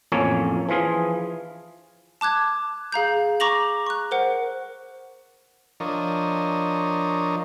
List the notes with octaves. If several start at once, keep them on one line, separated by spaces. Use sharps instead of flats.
A1 F2 A#3 C#4 C#5 A5
E3 F3 F4 G#4
A5 D6 F#6 G#6
G#4 F5 A#5 G6
A#5 C#6 D6 A#6 F7 F#7
C#6 F#6
A#4 C5 F#5
F3 D4 A#4 C#5 D#5